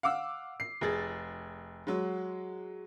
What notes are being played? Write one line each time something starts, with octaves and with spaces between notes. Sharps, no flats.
F5 F#5 D6 E6
C7
F1 G#4 A6
F#3 G#3